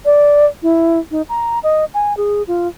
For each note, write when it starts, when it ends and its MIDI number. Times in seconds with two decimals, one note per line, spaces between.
0.05 0.46 74
0.63 0.99 64
1.11 1.22 63
1.29 1.59 82
1.63 1.85 75
1.94 2.16 80
2.17 2.43 68
2.47 2.68 65